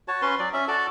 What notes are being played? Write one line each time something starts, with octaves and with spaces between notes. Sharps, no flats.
F#4 C#5 A5
C#4 B4 C6
F#3 D5
C#4 E5
F#4 A4 D5 A5